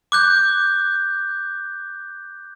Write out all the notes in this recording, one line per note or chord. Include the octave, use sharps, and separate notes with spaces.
D6 F#6 G6